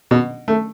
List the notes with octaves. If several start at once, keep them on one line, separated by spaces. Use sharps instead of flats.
B2
A3